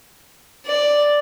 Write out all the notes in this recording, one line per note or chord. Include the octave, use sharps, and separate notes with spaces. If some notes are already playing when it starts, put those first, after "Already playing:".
D5